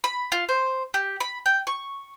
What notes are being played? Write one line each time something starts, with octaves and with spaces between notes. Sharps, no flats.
B5
F4
C5
G4
B5
G5
C#6